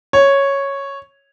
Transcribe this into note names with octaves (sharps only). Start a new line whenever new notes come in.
C#5